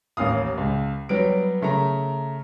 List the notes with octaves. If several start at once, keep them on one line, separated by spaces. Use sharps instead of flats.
A1 D#2 A#3 F5 D#6
C#2
F#3 G3 B3 D7
C#3 A3 A#4 A#5